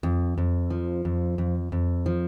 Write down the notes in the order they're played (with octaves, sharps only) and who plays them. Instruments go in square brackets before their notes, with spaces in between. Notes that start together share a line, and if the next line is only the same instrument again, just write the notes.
[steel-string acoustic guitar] F2
F2
F3
F2
F2
F2
F3